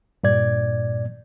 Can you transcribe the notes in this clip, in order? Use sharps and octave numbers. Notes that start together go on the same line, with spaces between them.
G2 A#2 D5 G#6